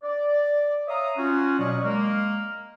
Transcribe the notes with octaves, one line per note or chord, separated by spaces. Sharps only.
D5
C#5 E5 F5 A#5 D#6
C#4 F4 F#4
B2 F#3 D5 D#5 F5 C#6
G#3 A#3